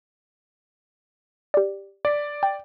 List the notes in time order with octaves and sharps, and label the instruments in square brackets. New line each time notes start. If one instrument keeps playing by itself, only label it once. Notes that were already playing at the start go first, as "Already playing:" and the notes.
[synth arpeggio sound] G4 D5
[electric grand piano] D5 [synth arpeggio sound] A6 B6
[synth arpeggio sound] G5